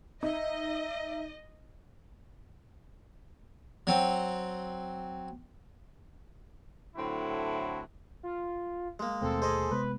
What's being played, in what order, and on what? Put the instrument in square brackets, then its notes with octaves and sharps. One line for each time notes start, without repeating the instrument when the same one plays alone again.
[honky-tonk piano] D#4 [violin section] D#5 [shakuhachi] E5
[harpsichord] F#3 C4
[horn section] A2 D3 F#3 C4 E4 F#4
[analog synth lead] F4
[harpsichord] G#3 A#3
[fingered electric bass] D#2 B2 A3 [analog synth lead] C4 [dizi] A4
[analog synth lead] G#4 [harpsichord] C5 D#5
[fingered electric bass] C3 G#3 B3 [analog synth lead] B4